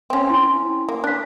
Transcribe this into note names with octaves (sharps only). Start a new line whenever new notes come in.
C4 C#4
E4 C6
A#3
D4 F#6 B6